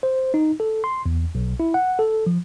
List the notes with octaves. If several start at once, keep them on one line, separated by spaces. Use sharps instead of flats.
C5
D#4
A4
C6
E2
B1
E4
F#5
A4
F3